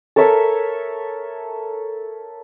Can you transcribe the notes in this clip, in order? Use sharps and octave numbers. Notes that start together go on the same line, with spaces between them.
A4 A#4 C#5 E5